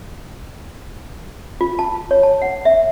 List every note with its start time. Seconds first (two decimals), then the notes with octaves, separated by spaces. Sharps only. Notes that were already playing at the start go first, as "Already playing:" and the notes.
1.61 F4
1.79 A5
2.11 C#5
2.23 A5
2.42 F#5
2.65 E5